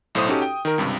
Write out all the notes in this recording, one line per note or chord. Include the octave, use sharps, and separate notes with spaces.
B1 A2 A3 C5 D#6
C#4 D#4 F#4 G4 A4
G5
D#3 A#4
C#2 G2 C3